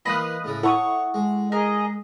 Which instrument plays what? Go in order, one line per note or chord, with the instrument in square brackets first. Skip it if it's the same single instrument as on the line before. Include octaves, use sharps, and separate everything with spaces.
[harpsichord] E3 A#3 C6 [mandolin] D#5 F5 [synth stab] B5 D#6 F#6
[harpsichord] A2 C#3 E4
[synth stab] E4 A4 [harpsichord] C#5 [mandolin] F#5 C#6 D#6
[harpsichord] G#3
[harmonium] G#4 D#5 [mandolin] A#4